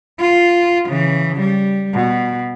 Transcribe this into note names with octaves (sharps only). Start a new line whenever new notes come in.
F4
C#3 E3
G3
B2